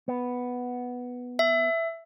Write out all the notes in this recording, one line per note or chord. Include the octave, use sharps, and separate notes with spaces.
B3
E5